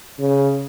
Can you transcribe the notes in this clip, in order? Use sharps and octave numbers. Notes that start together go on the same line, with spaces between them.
C#3